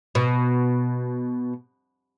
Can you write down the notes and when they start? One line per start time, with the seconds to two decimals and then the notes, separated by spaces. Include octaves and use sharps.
0.15 B2